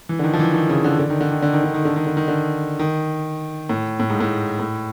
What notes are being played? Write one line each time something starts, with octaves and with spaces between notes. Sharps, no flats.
E3
D3
D#3
F3
E3
D#3
C#3
D3
D3
D#3
D3
D#3
D3
D#3
D3
D#3
D3
D#3
D3
D#3
D3
D#3
A2
A2
G#2
A2
A2